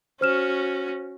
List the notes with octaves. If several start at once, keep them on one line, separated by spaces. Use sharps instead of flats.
C#4 F#4 C5 F6 E7